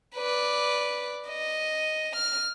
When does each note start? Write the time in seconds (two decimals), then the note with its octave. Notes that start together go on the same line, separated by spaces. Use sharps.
0.16 B4 D5
1.30 D#5
2.16 F6